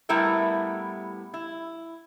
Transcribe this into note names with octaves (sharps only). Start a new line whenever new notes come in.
A2 G3 B3 E4 A#4 E5
E4